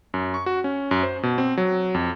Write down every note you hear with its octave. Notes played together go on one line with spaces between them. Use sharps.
F#2
C#6
F#4
C#4
F#2
C5
B2
C4
F#3
F2